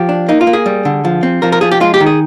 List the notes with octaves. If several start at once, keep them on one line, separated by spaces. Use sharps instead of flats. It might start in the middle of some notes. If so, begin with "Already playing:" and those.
Already playing: F3 G4
D4
A#3 D#4
F4
A#3
G#4
G3
D3
F3
C4
F3 A#4
A#4
F3 G#4
G4
G#3 F4
G4
D#3
G#4